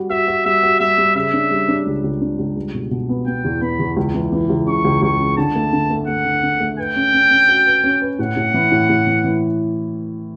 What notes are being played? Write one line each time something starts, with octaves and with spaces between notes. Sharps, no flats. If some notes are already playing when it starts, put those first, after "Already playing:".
Already playing: G3 F#4
F#4 E5
F#4
G3 E5
F#4
G3 E5
G3
C#3 E5
D4
G3
D4
C#2
C#2
D4
C#2
G3
B2
B2
B3
B3 G5
E2
B3 B5
E2
C#2
E3
E3
C#2
C#3 C#6
C#2
C#2 C#6
C#3
D3 A5
A3
D3
A3
A3 F#5
D3
D3
A3
B4 G5
C#4
C#4
C#4
F#4
B4
C#4
B4
A2 F#5
A2
E3
A2
A2
E3
E3